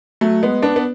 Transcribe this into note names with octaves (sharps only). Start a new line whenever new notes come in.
F#3 A3
G#3 B3
B3 D4
B3